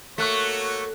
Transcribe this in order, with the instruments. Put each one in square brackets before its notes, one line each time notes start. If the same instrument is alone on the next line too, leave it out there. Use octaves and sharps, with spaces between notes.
[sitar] A3 [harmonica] A#3 F#4 C#5 [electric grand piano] C#6 F#6 B6